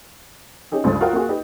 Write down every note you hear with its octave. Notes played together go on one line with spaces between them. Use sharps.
C#4 D#4 G4 G#4
C#2 G2 A4 C5 D#6 A6
F4 F#4 A#4 F#5 G5
A#3 F4 F#4 G#4
D#4 G4 B4